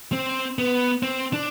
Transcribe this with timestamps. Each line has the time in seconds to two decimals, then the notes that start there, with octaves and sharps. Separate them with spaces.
0.13 C4
0.59 B3
1.03 C4
1.33 D4